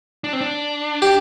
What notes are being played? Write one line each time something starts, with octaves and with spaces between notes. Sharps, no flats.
D4
C4
D4
G4